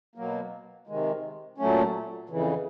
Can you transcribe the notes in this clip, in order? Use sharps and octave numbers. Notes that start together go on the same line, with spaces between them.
B2 F#3 A#3
C3 D#3 G#3
A#2 F#3 A3 C#4
F2 C#3 E3